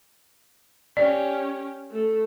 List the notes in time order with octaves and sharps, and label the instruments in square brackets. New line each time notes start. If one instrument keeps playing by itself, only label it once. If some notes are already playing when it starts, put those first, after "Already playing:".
[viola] C#4 G4 [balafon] D5
[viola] A3 A4